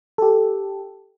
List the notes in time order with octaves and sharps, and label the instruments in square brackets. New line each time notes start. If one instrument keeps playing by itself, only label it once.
[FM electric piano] G4 A4